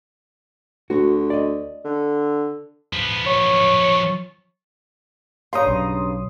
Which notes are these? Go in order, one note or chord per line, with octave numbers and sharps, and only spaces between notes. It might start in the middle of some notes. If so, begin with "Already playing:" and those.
D2 F#4
D5 D#5
D3
F3 B3
C#5
G2 C#3 C#5 F5 A#5 C6 D#6
B1